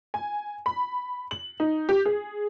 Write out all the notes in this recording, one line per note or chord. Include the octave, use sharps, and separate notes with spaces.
G#5
B5
F#7
D#4
G4
G#4